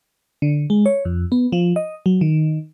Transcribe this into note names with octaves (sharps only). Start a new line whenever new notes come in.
D3
G#3
C#5
F2
B3
F3
D#5
F#3
D#3